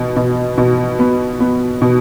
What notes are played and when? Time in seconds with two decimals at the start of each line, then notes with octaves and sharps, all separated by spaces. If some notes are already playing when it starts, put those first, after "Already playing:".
Already playing: B2
0.16 B2
0.58 B2
0.99 B3
1.40 B3
1.82 B2